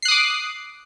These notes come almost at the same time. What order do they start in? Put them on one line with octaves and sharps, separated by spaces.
C7 F#6 D#6 D6